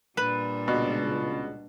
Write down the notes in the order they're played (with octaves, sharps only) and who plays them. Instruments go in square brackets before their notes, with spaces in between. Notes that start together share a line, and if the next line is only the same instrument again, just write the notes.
[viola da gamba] A#2 G3 D4 [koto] B4
[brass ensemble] C#2 [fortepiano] B2